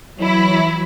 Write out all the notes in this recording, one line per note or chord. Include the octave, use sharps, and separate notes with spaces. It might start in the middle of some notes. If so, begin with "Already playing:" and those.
E3 F#3 E4